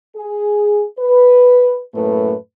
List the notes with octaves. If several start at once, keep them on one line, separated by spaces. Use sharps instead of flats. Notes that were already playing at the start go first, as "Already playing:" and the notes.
G#4
B4
F#2 A2 A3 A#3 B4